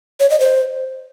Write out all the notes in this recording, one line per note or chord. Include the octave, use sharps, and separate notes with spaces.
C#5
D#5
C5